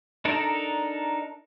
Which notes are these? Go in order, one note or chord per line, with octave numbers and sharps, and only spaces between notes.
D4 D#4 A4 A#4